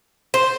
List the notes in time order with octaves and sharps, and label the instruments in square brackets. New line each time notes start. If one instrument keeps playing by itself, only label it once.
[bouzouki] C5